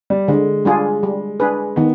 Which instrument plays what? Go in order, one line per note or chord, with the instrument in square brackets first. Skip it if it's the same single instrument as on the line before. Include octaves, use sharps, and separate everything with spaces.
[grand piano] G3
[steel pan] D3 [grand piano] G#3
[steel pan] G3 D4 F4 G#4
G3
D4 G#4 B4
[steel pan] D#3 [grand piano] B3